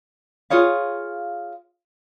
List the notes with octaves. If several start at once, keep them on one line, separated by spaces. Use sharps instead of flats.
F4 G#4 C#5 F5